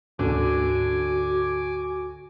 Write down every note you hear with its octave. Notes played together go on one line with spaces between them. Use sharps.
D2 G#2 D3 C#4 F#4 G#5 D6